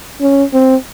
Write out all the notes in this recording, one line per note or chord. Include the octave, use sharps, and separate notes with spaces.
C#4
C4